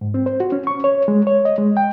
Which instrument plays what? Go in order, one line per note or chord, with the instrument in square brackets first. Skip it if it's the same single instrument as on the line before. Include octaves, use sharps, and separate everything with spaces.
[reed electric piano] G#2
C4
C5
F#4
C#4
C#6
C#5
G#3
C#5
D#5
G#3
G5